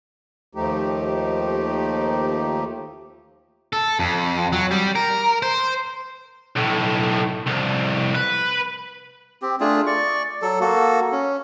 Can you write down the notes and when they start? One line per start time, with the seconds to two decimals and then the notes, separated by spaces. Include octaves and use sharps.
0.55 D#2 F3 A3 D#4 G4
3.73 A4
3.99 F2
4.53 F#3
4.71 G3
4.96 A#4
5.42 C5
6.56 B1 A2
7.46 C2 F2
8.15 B4
9.42 C4 G4
9.60 A3 D4 F4 G#4
9.87 D5 C#6
10.42 F#3 A4
10.61 A#3 F#4 A4
11.12 C#4